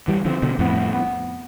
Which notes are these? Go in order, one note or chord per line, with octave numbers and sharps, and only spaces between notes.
E3 G3
D3 F3 C4
B2 D3
F2 A2 B3
B3